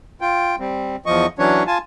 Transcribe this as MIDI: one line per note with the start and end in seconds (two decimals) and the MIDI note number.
0.21 0.56 65
0.21 0.56 79
0.60 0.96 55
0.60 0.96 60
1.06 1.26 40
1.06 1.26 53
1.06 1.26 75
1.06 1.26 85
1.39 1.63 52
1.39 1.63 54
1.39 1.63 61
1.39 1.63 62
1.39 1.63 73
1.67 1.78 65
1.67 1.78 80
1.67 1.78 81